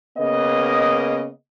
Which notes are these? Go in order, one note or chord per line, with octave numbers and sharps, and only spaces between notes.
C#3 A#3 B3 D#5